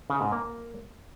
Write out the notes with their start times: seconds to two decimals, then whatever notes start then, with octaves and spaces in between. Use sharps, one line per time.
0.10 C#3
0.21 G#2
0.32 A#3